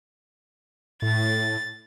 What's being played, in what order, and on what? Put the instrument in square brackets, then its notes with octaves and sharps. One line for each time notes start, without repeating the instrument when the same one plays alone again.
[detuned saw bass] A2 [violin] A6